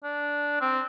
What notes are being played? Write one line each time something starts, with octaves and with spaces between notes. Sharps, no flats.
D4
C4